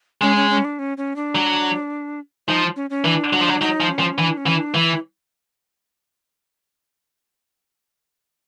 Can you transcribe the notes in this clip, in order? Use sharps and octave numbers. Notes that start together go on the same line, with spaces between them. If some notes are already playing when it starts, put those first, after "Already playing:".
G#3 C#4
C#4
C#4
D4
C#4
C#4
D4
F#3
F3 D#4
C#4
C#4
E3 D4
F#3
F3
F#3
F#3 D#4
F3
C#4
F3
E3 D4
C#4
E3
D4
E3 E4